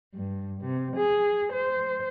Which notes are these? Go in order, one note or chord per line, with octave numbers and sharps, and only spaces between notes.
G2
C3
G#4
C5